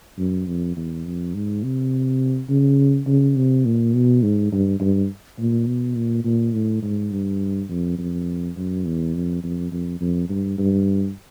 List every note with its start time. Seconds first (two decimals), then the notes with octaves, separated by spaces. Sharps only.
0.18 F#2
0.47 F2
0.76 E2
1.05 F2
1.34 G#2
1.63 C3
2.49 C#3
3.07 C#3
3.36 C3
3.65 A#2
3.94 B2
4.23 G#2
4.52 G2
4.80 G2
5.39 A#2
5.67 B2
5.96 A#2
6.25 A#2
6.53 A2
6.82 G#2
7.11 G2
7.70 F2
7.98 F2
8.57 F#2
8.85 E2
9.15 F2
9.43 F2
9.72 F2
10.01 F2
10.29 G2
10.58 G2